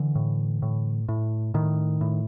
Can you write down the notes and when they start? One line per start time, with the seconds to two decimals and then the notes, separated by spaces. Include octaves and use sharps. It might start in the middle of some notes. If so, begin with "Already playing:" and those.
Already playing: D3 E3
0.15 A2
0.62 A2
1.09 A2
1.54 A2 D#3
2.01 A2